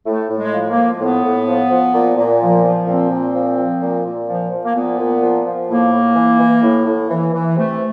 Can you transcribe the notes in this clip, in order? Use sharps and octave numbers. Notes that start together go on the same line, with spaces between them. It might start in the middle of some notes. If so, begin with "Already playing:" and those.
A2 A3
A2
G#3
F3
A#3
F3
A2 B3
A2
F3
F3
A#2
A#2
F3
F3
A#2 C4
A#2
F3
F3
A#2
A#2
F3
F3
A#3
A#2 B3
A#2
F3
F3
A2 A#3
A2
E3
E3
A2
A2
E3
E3
C3 A3